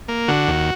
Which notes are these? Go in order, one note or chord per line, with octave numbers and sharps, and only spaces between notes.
A#3
D3 F#4
D#2